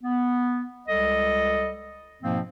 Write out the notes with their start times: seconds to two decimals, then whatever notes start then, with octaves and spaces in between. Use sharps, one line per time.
0.02 B3
0.87 C#2 G3 A4 D#5
2.21 G#2 B2 F3 A#3 C4